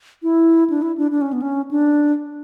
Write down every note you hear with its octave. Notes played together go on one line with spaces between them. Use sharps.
E4
D4
E4
D4
D4
C#4
B3
C#4
D4